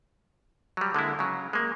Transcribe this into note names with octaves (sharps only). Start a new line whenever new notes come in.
F#3 G3
D3 G#3 A#3 E4
C#3 F#3
G#3 A#3